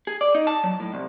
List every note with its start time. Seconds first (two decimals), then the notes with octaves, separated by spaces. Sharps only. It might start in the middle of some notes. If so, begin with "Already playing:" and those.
0.07 G#4
0.21 D5
0.35 D#4
0.47 A5
0.64 F#3
0.80 A2
0.94 C2